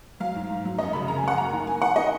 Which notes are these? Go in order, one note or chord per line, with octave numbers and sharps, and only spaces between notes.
F#3 F5
G#2
G#2
F#3
F#2 D#5
C#3 B5
C#3 A#5
G#5
F#2 F#5
A#3 A#5
D#3
A#3 G#5
D#3 F#5
D#3 D#5